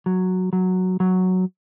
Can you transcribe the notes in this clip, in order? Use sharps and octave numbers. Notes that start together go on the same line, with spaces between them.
F#3
F#3
F#3